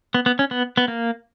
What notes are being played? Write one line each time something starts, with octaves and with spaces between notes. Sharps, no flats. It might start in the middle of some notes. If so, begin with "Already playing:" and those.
B3
B3
C#4
B3
B3
A#3